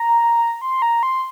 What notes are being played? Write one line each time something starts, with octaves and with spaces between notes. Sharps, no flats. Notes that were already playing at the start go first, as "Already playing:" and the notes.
Already playing: A#5
C6
A#5
C6